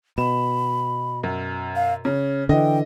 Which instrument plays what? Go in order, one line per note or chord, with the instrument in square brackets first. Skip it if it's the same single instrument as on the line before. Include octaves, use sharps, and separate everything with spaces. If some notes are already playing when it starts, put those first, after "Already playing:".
[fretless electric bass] B2 [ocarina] B5 [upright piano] E7
[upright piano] F#2
[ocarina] F5
[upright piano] C#3 [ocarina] C#5
[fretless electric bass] D3 E3 [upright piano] D#5 [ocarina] G5